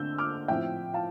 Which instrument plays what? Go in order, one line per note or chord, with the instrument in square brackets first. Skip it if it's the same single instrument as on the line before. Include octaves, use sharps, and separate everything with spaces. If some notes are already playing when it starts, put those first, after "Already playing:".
Already playing: [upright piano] D3 A3 C4 E6 G6
D6 F6
A2 F3 C4 E5 G5
F5 A5